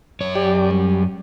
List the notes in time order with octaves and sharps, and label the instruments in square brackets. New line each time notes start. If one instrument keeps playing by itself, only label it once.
[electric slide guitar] F#2 C#5
[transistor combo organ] G4 D5
G3